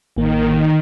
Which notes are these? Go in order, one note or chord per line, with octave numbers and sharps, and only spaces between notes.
A1 D#3 A#3